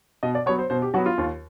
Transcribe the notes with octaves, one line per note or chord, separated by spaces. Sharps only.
B2 D#5
D5
F#3 B3 C#5
C5
B2 C5
G4
F#3 B3 F#4
F4
D#2